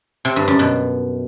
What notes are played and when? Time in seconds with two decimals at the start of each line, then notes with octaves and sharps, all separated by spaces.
0.25 C3
0.36 G2
0.48 F#2
0.59 B2